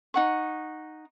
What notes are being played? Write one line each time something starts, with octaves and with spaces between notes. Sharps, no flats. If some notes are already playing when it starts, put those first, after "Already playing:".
D#4 F#5 C#6